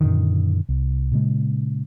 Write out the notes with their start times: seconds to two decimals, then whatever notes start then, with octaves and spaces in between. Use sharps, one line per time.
0.01 F#2 A#2 D3 D#3
0.69 C2
1.12 A#2 C#3 G#3